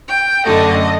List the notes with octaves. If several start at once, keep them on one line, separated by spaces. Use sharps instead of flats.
G5
F#2 D3 A3 D#5